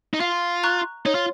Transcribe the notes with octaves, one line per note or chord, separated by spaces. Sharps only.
D#4
F4 F5
A#5 C#6 F#6
D#4 C#5
F4